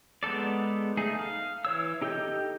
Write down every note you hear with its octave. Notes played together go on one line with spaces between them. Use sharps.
G#3 B3 D#4 A4 D5
A3 D#4 G#4
F5
E3 C#5 E6
D#4 G4 A4 D#5 G6